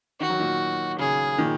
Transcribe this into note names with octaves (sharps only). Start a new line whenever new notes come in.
D#3 F#4
F#3
A#2 D#3
C#3 G#4
A#2 D#3